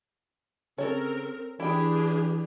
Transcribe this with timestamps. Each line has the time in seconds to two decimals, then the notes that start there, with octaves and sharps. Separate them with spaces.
0.78 C#3 C4 A4 A#4 C#5
1.60 E3 D4 E4 G4 G#4 G5